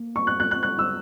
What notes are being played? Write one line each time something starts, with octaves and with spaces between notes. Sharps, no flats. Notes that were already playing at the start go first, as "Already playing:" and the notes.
Already playing: A#3
C#6
F#6
F#6
F#6
F#6
E6